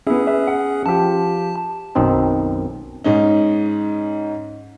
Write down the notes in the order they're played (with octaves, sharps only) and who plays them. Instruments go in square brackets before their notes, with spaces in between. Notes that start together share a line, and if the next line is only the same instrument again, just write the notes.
[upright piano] B3 E4 [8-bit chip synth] C#4 G#4
[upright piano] B4 E5
F#5
[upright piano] F3 G4 [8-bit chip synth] A5
[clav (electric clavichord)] B1 F#2 D#3 C4 D#4
[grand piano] G#2 C#4 D#4